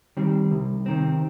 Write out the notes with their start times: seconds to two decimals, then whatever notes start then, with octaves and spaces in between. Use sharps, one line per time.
0.17 D#3 G3 C4
0.51 C2
0.86 C3 D#3 C4